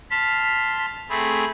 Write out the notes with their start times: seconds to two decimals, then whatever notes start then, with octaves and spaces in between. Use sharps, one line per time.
0.11 A5 C6 F6 B6
1.10 A3 C4 G#4 B5